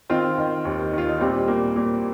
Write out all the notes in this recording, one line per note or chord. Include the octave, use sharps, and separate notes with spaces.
D#3 C4 F4
D#3
D#2
D#3 F4
D#4
A#2 G3 C4
A#2 A#3
A#2 A#3